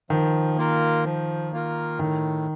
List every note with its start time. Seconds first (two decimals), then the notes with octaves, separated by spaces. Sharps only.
0.10 D#3 F3
0.57 A#3 F4 A#4
1.05 F3
1.52 A#3 F4 A#4
1.99 A2 D#3